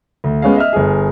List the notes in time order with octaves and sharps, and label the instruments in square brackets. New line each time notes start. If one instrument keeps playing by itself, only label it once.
[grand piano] D2
G#3 B3 C#4 G#4 F5
D#5 E5 F6
G1 G#4